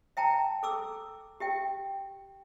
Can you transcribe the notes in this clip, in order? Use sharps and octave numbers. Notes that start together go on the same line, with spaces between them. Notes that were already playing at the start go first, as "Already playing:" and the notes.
E5 G5 A5 A#5
A4 D6 E6
G4 E5 G5